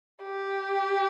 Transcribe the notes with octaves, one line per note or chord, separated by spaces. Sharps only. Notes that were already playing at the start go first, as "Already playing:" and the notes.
G4